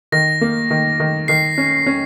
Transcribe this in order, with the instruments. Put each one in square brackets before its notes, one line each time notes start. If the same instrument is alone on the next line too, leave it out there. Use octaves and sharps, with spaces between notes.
[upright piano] D#3 [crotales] A#6
[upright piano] A#3
D#3
D#3
[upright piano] D#3 [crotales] C7
[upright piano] C#4
C#4